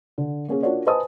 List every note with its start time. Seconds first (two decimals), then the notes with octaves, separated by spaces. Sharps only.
0.18 D3
0.48 A#3 C#4 G#4
0.63 D4 F4 F#4 A#4 C#5 D5
0.87 B4 C5 D#5 G#5 A5 D#6